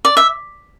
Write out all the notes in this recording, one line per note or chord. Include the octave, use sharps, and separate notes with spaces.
D5
E5